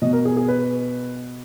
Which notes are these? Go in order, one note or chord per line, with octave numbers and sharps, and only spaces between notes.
B2 D#5
A#4
G#4
G#4
B4